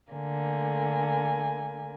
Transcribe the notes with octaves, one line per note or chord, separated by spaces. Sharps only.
D3 A3 A#3 G#5